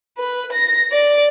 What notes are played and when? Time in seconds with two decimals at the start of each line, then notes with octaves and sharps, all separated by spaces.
0.18 B4
0.52 A#6
0.92 D5